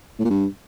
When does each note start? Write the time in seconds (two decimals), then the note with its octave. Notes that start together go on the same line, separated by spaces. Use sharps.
0.20 A2
0.25 A#2
0.30 G2